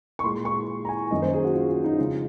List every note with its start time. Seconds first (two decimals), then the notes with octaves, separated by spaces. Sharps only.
0.19 C#6
0.24 A#2 G#3 C6
0.45 C#6
0.85 A#5
0.89 G#5
1.11 F#2 D#3 A#3 D#5
1.22 C5
1.34 G#4
1.44 F#4
1.55 F4
1.70 F#4
1.84 D#4
1.98 F2 C#3 G#3 F4